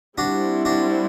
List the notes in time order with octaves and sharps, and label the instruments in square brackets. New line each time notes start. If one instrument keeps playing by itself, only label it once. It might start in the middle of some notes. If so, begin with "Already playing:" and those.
[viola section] G3 C4 E4 [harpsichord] D4 F#4
[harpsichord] D4 F#4